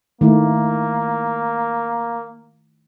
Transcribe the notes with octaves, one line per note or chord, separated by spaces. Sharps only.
D#3 A3 A#3 E4